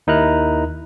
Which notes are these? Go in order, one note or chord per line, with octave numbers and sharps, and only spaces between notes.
D#2 D#4 E4 A#4 A#5 F#6